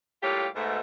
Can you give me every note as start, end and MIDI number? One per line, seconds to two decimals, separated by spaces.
0.22 0.47 45
0.22 0.47 55
0.22 0.47 58
0.22 0.47 65
0.22 0.47 67
0.22 0.47 73
0.55 0.80 44
0.55 0.80 47
0.55 0.80 57